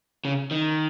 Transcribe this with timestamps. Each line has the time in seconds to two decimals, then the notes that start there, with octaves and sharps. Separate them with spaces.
0.25 C#3
0.51 D#3